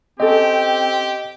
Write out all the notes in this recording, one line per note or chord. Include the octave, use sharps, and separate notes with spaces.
C4 C#4 G4 A4 D#5